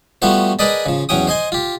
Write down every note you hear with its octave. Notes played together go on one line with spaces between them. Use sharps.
F3 G3 A3 B3 F#4 C5
G#4 A#4 B4 D5 D#5 A5
C#3 F3
E2 F#3 C#4 G5 D#6
C5 D#5 G#5 C6
F4 G4